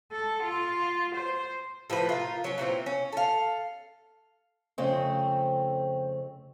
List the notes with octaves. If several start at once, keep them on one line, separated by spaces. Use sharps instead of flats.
A4
F4
C5
A2 F3 F4 B4
F4 A#4
F#3 C#4
A#2 E3 C4 F4
C#4
A4 F5
F2 C#3 A3 C4